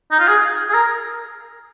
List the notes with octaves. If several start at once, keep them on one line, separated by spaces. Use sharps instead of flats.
D#4
F4
G#4
G#4
A#4